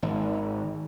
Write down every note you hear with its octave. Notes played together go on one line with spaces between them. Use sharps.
G#1